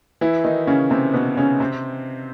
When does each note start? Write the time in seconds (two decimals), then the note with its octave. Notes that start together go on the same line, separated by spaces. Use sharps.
0.21 E3 E4
0.44 D#3 D#4
0.67 C#3 C#4
0.90 C3 C4
1.13 B2 B3
1.37 C#3 C#4
1.60 C3 C4